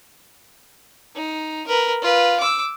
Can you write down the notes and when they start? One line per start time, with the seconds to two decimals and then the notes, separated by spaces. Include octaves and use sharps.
1.15 D#4
1.67 A#4 B4
2.02 F4 B4
2.40 D6 E6